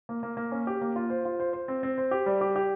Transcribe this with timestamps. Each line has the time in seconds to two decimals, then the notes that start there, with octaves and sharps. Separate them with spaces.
0.09 A#3
0.23 A#3
0.37 A#3
0.52 C#4
0.67 G4
0.81 A#3
0.96 F4
1.10 C5
1.25 F4
1.40 C5
1.53 C5
1.68 C4
1.83 C4
1.98 C5
2.11 G4
2.26 G3
2.41 G4
2.56 G4